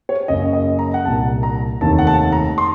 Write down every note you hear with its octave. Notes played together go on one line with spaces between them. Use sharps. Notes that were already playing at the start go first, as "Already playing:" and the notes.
C#5
F#1 F#2 C#3 D#5
D#5
A#5
F#5
C2 A#2 A5
A#5
F1 D#2 D#3 A5
F#5
A5
A#5
C6